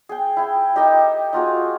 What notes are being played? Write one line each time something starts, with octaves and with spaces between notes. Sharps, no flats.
G#4 G5
E4 G5
D#4 G4 A4 D#5
D#4 F4 F#4 G#4